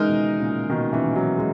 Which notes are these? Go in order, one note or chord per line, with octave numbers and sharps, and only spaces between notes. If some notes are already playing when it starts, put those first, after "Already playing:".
Already playing: C#3 E3 G#3 D#4 A#4
B2 D#3
A#2 C#3
B2 D#3
C#3 E3
D#3 F#3
G#3